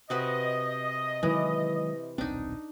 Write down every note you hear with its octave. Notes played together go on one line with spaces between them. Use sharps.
C3 F#4 B4 D#5
D#3 E3 F#3 G#3
D#1 B1 C4 D4 D#4